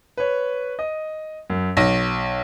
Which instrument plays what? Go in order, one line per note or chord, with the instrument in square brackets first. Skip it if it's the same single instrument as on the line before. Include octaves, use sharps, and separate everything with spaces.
[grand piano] B4 C#5
D#5
F#2
[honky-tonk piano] B1 [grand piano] A#6